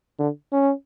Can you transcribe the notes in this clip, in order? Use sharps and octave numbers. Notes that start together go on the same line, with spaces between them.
D3
C#4